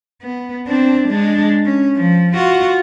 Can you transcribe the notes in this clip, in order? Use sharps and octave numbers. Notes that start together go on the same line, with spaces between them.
B3
C4 D4
G#3 D4
C#4
F3
F4 F#4